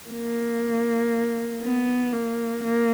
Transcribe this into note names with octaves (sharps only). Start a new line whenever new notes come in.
A#3
B3
A#3
A#3